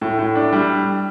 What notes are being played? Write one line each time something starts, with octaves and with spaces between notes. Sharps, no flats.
A2
A2
D4
G3